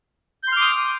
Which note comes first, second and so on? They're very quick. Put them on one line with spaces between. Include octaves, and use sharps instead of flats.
G6 C6 F6 D6 D#6